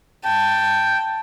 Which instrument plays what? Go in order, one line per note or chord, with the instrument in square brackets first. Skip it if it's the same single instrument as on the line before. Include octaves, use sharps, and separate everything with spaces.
[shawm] G5 [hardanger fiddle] A5